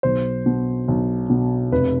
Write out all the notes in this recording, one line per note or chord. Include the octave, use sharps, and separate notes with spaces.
B1 C5
B2
B1
B2
F1 B4